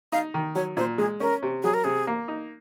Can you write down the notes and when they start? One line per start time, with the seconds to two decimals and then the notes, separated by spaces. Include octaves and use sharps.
0.12 D#4 F5
0.34 D#3
0.55 F#3 C#5
0.77 A#2 C5
0.98 G#3 G#4
1.20 C#4 A#4
1.42 C3
1.63 F#3 G#4
1.74 A#4
1.84 C3 G#4
2.07 A#3
2.28 D#4